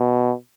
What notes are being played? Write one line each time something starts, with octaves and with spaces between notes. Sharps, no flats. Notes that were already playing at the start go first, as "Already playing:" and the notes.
Already playing: B2